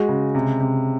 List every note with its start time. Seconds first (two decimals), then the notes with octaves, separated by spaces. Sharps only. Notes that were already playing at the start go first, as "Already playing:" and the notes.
Already playing: G#3 F#4
0.09 C#3
0.35 C3
0.61 C3